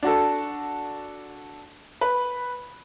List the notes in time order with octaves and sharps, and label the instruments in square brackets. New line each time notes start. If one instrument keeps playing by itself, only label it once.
[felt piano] D4 F#4 A4
B4